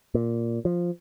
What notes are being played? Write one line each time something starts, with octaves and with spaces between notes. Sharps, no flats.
A#2
F3